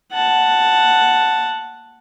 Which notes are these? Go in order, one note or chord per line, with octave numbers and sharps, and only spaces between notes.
F#5 A5